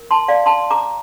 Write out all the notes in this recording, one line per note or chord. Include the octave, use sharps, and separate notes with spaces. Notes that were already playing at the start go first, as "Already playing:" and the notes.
Already playing: A#4
A5 C6
D5 F5
A5 C6
A#5 D6